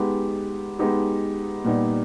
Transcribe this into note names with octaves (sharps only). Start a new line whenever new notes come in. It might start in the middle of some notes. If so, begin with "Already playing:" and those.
Already playing: G#3 B3 D#4 G4
G#3 B3 D#4 G4
A#2 G3 B3 D#4 G4